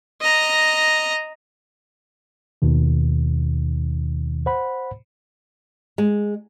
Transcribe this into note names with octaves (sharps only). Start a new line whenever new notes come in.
D#5 A#5
D#2 B2 D#3
C5 F#5 B5
G#3